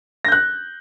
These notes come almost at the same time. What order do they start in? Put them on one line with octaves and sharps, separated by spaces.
A#6 G6 F#6